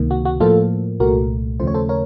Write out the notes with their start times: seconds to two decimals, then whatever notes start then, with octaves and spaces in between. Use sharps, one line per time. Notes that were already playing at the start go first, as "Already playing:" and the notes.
Already playing: C#2 C3 D#3 A#3
0.11 F#4
0.25 F#4
0.40 A2 F3 A#3 F4 A4
1.00 C2 A#2 A3 F#4 A#4
1.60 D#2 C#3 F3 A3 C5
1.67 C#5
1.74 A4 C5
1.89 A#4 C#5